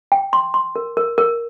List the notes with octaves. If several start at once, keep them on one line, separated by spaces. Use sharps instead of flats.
G5
C6
C6
A#4
A#4
A#4